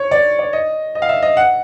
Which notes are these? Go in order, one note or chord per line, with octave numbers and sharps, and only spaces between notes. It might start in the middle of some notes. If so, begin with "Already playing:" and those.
Already playing: C#5
D5
D5
D#5
D#5
F5
E5
D#5
F#5